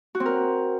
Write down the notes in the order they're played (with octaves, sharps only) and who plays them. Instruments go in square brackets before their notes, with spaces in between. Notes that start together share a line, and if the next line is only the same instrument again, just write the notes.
[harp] F#4
C4
A#4